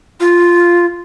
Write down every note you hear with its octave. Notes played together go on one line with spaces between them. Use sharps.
F4